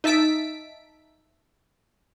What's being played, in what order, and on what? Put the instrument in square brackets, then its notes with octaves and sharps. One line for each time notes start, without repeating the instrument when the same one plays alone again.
[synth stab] D#4 E5 A5 B6 D7